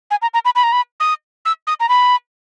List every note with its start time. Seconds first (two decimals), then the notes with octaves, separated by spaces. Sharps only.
0.11 G#5
0.22 A#5
0.34 A#5
0.45 B5
0.55 B5
0.63 A#5
0.72 B5
1.00 D#6
1.45 E6
1.67 D#6
1.80 A#5
1.89 B5